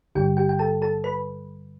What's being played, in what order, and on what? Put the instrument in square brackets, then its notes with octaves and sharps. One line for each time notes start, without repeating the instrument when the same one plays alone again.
[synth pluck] A1 G2 D3 G3 G4 G5
G4 G5
G5
A4 A5
A4 A5
B4 B5